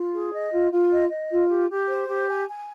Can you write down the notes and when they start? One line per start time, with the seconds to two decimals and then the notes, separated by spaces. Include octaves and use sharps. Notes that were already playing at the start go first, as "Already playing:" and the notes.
Already playing: F4
0.13 G#4
0.33 D#5
0.52 F4
0.72 F4
0.92 D#5
1.11 D#5
1.30 F4
1.50 G4
1.70 G4
1.89 C5
2.08 G4
2.29 G#5
2.48 G#5